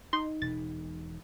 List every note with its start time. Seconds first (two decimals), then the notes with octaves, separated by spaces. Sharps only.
0.13 D#4 C6
0.42 E1 B2 A6